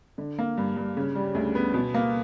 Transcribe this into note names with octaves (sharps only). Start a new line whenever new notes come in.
D3
A#3
G2
G2
C#3
G3
D2
B3
B2
A#3